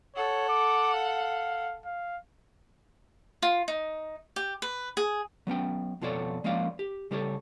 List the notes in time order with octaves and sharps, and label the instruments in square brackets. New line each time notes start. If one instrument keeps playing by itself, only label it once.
[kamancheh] A4 F#5 [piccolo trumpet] C#5
[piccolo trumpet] D6
F5
F5
[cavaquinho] F4
D#4
G4
B4
G#4
[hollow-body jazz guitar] F#3 B3 C#4 G5
F2 B2 F4 A4 C#5 D5
F3 G#3 A#3 C#4 D5 F5
G4
C#3 G3 G4 A4 B4 C#5